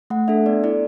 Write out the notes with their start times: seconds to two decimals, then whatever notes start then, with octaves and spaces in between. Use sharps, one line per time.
0.10 A3 F#5
0.28 D4 A4 E5
0.46 B3 D5
0.64 E4 A4 D5